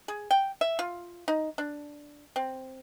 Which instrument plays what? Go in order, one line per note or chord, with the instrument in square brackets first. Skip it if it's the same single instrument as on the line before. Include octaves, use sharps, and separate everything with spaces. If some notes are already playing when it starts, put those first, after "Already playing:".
[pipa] G#4
G5
E5
F4
D#4
D4
C4